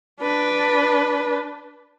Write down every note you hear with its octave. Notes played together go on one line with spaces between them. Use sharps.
D4 B4